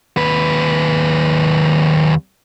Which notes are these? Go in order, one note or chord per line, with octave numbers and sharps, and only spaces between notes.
D#2 B4